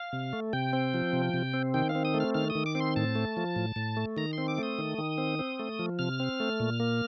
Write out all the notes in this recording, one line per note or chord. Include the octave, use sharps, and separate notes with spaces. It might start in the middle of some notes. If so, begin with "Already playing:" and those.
Already playing: F5
C3
A3
C3 G5
C4
F3
C3
C3
C4
D#3 G5
F5
C4
D#6
A3
F6
D#3 F6
D#6
D#3
D6
C4
C6
A2 A5
A3
F3
A2
A2
A3
D#3 A#5
C4 C6
D6
A3 D#6
D#3
D#3
C4
C4
A3
F3
C3 F6
C4
A3
A#2
A#3